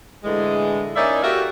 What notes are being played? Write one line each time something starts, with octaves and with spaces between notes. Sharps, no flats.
A2 D3 E3 G#3
A#3 C#4 D#4 E4 D5 E5
F#4 G4 A4 A#4 E5 F5